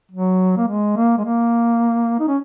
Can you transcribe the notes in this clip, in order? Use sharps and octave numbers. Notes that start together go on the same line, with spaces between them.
F#3
A#3
G#3
A#3
G#3
A#3
D#4
C#4